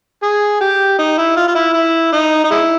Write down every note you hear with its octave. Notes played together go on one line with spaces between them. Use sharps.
G#4
G4
D#4
E4
F4
F4
E4
E4
D#4
D#4
G#3 E4